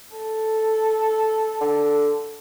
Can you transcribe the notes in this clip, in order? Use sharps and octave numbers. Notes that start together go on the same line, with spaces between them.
A4
D3